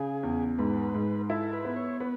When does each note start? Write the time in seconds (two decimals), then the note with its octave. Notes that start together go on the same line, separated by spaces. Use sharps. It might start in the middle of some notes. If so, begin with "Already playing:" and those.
Already playing: C#3 G#4
0.23 E2
0.58 G#2 B4
0.94 G#2
1.30 E4 A4
1.53 B4
1.65 B3
1.76 C#5
2.00 B3 B4